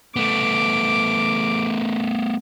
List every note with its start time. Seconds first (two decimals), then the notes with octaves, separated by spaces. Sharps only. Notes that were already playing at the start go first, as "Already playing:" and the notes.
0.16 A3 B3 D6